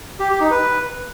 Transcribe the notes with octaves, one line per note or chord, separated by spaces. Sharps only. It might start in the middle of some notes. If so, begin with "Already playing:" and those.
G4
G4
D#4
B4